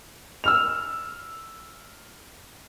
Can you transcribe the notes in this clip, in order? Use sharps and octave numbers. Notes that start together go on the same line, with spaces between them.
E6 F6 F7